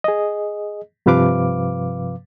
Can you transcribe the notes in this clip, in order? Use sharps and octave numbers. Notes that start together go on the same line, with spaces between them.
G#4 D#5
G2 C3 F3 B4 F5 D6